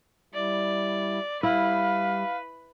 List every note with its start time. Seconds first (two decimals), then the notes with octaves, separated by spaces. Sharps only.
0.34 G3 E4 D5
1.43 G3 E4 B4 F5